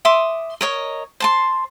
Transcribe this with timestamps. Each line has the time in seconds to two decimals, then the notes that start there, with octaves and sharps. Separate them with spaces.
0.05 E5 C6 D6 D#6
0.61 A#4 C#5 D#5
1.20 C5 A5 C6